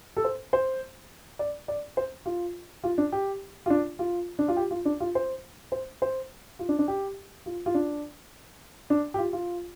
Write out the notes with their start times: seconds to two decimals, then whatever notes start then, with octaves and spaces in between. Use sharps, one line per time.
0.17 A4
0.24 C5
0.53 C5
1.39 D5
1.68 D5
1.97 C5
2.26 F4
2.84 F4
2.98 D4
3.12 G4
3.66 F4
3.70 D4
3.99 F4
4.39 D4
4.48 F4
4.57 G4
4.71 F4
4.85 D4
5.00 F4
5.15 C5
5.72 C5
6.02 C5
6.59 F4
6.69 D4
6.79 D4
6.88 G4
7.46 F4
7.66 F4
7.74 D4
8.90 D4
9.14 G4
9.18 F4
9.33 F4